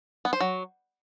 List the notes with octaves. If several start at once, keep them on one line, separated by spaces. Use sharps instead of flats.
B3
C5
F#3